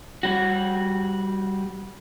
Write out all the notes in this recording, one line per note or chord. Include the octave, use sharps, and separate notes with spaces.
G3 F#4